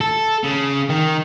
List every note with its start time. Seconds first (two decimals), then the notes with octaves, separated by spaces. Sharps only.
0.01 A4
0.44 C#3
0.90 D#3